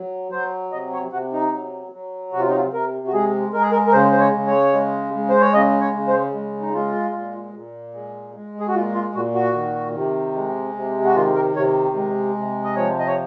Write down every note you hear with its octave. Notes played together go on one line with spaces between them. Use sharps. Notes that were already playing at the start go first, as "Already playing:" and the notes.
Already playing: F#3
F#3 C5
C3 D#5
C#5
C3 F#4
D#4
F#3
F#3
C3 F#4
F4
D#4
F4
C3 A#4
F#4
G#3 G#4
G#3 A#4
G#4
A#4
A#4
C#3 C5
C5
C#5
C#3
C#5
G#3
G#3
C5
C#5
C#3 D#5
C#5
C#3
C5
G#3
D#4
G#3 F4
A#2
A#2
G#3
G#3
G#4
F#4
A#2 F4
F4
A#2 F#4
F#4
D#3
C3
G#3
C3
F#4
D#3 F4
A#4
C3 C#5
G#3
C3
D#5
F3 C#5
D#5
C#5